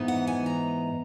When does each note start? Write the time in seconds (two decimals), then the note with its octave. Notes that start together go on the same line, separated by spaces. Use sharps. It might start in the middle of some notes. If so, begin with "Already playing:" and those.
Already playing: G#2 E3 B3 D#4
0.08 F#5
0.27 G#5
0.46 A#5